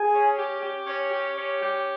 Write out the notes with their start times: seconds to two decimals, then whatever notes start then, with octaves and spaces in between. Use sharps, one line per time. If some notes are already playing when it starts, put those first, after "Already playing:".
Already playing: G#4
0.13 C#4
0.37 G4
0.62 G4
0.87 C#4
1.12 G4
1.36 C#4
1.61 G4